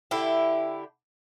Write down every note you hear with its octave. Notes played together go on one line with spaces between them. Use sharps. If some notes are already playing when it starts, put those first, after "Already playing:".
D3 E4 G4